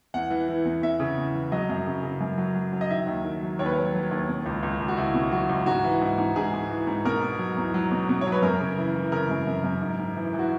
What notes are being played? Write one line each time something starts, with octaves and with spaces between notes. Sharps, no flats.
E2 F#5
E3
E3
E2
E2 E5
C#3
E2
E3
F#3 D#5
F#2
C#3
C#3
F#2
F#3
F#3
F#3
D#5
D#3 E5
D#2
D#3
F#3
D#2 C#5
B4
F#3 C#5
F#3
D#2
B2
C#2
C#2
C#2
F#4
C#2 E4
B2
F#3 F#4
C#2
G#2 F#4
E3
G#2
G#2
G#2 G#4
G#2
E3
G#2
B2 A#4
B2
F#3
E2
F#3
B2
B2
F#3 C#5
B4
F#2 A#4
C#3
E3
E3
C#3 A#4
F#2
F#2
F#2
G#2
G#2
E3
E3
F#4